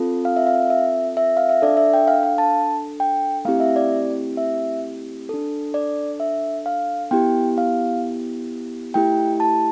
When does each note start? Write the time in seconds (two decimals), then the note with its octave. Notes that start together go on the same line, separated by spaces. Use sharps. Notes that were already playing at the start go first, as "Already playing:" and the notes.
Already playing: C4 F4 A4
0.25 F5
0.36 E5
0.47 F5
0.70 E5
1.17 E5
1.37 F5
1.49 E5
1.62 D4 A4 D5
1.77 E5
1.93 G5
2.08 F5
2.23 F5
2.38 A5
3.00 G5
3.45 A3 C4 E4 G4 F5
3.60 E5
3.76 D5
4.37 E5
5.29 D4 A4
5.74 D5
6.20 E5
6.66 F5
7.11 B3 E4 G4 G5
7.58 F5
8.94 A3 E4 G4 G5
9.40 A5